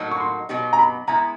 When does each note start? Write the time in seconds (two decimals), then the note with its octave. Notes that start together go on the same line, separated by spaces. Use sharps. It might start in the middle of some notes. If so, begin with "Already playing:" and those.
Already playing: A2 F#3 A#3 D#4 F#4
0.12 C#6
0.20 C6
0.49 B2 F#3 B3 D#4 G4
0.73 A#5
0.79 B5
1.08 G#3 B3 E4 A#5